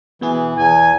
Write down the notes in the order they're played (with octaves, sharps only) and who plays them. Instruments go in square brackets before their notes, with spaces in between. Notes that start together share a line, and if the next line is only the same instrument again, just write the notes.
[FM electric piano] B2 B3 G#4 [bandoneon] E3
[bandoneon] E2 [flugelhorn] G#5